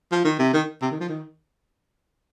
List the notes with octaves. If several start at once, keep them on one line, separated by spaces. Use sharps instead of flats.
F3
D#3
C3
D#3
C3
D#3
F3
D#3